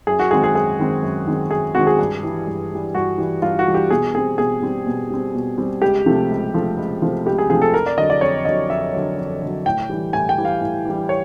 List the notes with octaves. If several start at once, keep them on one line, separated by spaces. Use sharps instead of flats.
F#2 G#4
F#4
D#3 G#3 C4 G#4
G#4
F#2 G#4
D#3 G#3 C4
F#2
D#3 G#3 C4
F#2 G#4
D#3 G#3 C4 F#4
G#4
G2
E3 G3
G2
E3 G3
G2 F#4
E3 G3
G2 F4
F#4
E3 G3
G4
B2 G#4
G3 C4 G#4
B2 G#4
G3 C4
B2
G3 C4
B2
G3 C4
C#2 G4
C3 F3 A3 C4
C#2
C3 F3 A3 C4
C#2
C3 F3 A3 C4
C#2 G4
G#4
C3 F3 A3 C4 G#4
A4
F2 A#4
D5
D3 F#3 D#5
D5
F2 C#5
D3 F#3 D#5
F2 E5
D3 F#3
F2
D3 F#3
A2 G5
E3 G3
A2 G#5
G5
E3 G3
F5
A2
E3 G3
C#5